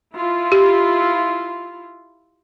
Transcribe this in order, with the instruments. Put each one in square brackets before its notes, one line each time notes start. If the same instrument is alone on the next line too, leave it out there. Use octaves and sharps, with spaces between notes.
[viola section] E4 F4
[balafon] G4